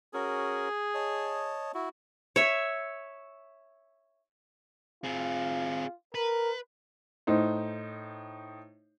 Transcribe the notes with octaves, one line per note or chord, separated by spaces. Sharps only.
C#4 F#4 G#4 A#4
C#5 D#5 A5
E4 F#4
C#5 E5
C4 F4 G#4
A#4 B4
A2 D#4 C5